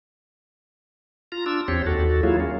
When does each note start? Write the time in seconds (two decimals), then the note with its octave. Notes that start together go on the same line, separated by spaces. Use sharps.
1.32 F4 A#5
1.46 D4 F4 E6
1.68 E2 C4 G4 C#5
1.87 D#2 F#4 A4
2.23 F#3 A#3 E4 F4 G#4
2.40 C#4